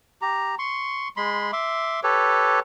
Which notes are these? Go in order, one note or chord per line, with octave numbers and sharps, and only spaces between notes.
G4 A#5
C6 C#6
G#3 B5 C6
E5 C6 D6
G4 A4 B4 C#5